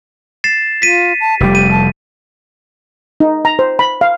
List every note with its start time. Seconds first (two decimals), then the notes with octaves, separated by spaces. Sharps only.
0.44 A6 C7 E7
0.82 F4 B6 D#7
1.20 A5
1.40 F1 G3 G4
1.55 D#7
1.71 A5
3.20 D#4
3.45 A#5
3.59 C5
3.79 B5
4.01 F5